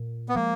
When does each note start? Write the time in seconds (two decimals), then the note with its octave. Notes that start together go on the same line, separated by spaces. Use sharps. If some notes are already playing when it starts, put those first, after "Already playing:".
Already playing: A#2
0.29 B3
0.35 F3 G#3 A#3